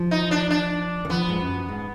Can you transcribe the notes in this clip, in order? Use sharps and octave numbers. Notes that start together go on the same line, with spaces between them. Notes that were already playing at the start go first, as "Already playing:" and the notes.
Already playing: F3
D#4
D4
D4
D#3
F3 B3
G#2
F#2
G#2